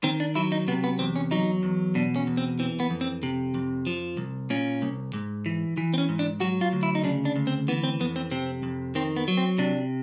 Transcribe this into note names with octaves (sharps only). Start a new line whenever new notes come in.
D#3 C4
D4
F#3 E4
D#4
C3 B3
B3
E2 C4
C#4
F#3 D#4
E2
B2 D4
C#4
E2
C4
E3 C4
B3
F2
C4
C3
F2
F3
C2
A#2 C#4
C2
G#2
E3
E3
C4
C#4
G#2
D4
F#3 F#4
F4
D2
E4
D#4
C#3 D4
D4
D2
C4
E3 B3
C4
F2 B3
C4
C3 C4
F2
D#3 C4
B3
F#3
C4
C3 D4